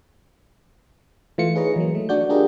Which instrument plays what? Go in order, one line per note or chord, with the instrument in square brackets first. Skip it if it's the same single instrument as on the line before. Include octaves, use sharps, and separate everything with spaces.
[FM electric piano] E3 A3 F4 C#7
D#4 G#4 B4 C#5 D#5 A#5
E3 F#3 A#3
A3
D4 F#4 D5 G6
D4 F4 G4 G#4 A#4 D#5